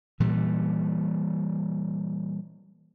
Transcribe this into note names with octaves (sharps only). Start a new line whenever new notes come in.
A#2 E3 G3